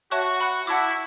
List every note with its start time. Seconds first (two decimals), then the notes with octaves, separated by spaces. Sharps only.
0.11 F#4 C#5 E5 A5 C#6 F#6
0.40 F#5 B5 F#6
0.67 E4 F#5 A5 D6